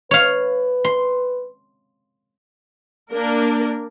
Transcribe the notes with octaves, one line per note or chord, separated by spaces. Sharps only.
B4 C#5 F5
C6
A#3 D4 A#4